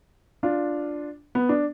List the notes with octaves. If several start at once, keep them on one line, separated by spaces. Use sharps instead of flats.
D4 F4
B3
D4